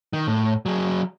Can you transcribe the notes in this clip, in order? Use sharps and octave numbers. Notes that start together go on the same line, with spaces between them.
D#3
A2
F#3 G#4